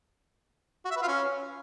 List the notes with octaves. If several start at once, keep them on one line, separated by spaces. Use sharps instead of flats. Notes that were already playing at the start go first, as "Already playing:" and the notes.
F#4
E5
B4
F4
C#4